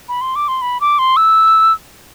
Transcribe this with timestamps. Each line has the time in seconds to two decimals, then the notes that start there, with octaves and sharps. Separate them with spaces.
0.09 B5
0.21 C6
0.36 D6
0.48 C6
0.62 B5
0.81 D6
0.99 C6
1.17 E6